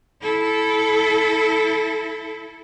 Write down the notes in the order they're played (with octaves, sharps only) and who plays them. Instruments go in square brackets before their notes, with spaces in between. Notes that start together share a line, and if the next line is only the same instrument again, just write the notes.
[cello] E4 A4